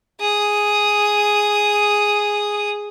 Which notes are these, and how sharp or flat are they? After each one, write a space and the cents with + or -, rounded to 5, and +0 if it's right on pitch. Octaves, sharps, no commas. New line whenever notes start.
G#4 +0 D#6 +0